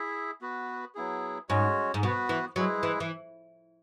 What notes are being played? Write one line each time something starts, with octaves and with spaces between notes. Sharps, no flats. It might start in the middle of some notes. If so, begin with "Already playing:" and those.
Already playing: E4 G#4 E5
B3 F#4 B4
F#3 B3 E4 G#4
G#2 G#3 C#4 F#4 C#5
G#2
B2 B3 F#4 B4
E3
F#3 G#3 E4 G#4 B4
E3
E3